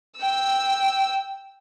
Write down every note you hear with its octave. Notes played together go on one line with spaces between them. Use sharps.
G5 E6